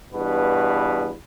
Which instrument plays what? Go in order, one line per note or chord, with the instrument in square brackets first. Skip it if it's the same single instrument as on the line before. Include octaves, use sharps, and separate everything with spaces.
[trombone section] E2 G2 B2 B4